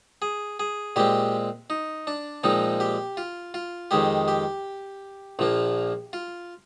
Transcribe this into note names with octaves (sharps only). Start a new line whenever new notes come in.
G#4
G#4
A#2 G#3 C4 G4
D#4
D4
A#2 F3 G#3 C4 D#4
G4
F4
F4
F2 D#3 G#3 G4
G4
A#1 A#2 F3 A#3
F4